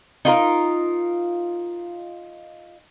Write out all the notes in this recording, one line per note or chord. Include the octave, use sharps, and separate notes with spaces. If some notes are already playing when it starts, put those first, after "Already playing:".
D#4 F4 A#4